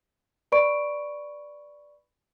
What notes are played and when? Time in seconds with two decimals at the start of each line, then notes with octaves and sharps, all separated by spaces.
0.52 B4 D5 B5 C#6 D7